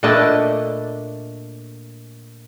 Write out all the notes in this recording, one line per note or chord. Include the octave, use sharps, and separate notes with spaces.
A#2 A3 D4 B4 D#5 A5